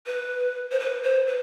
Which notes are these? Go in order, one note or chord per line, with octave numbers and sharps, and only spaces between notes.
B4
C5
B4
C5
B4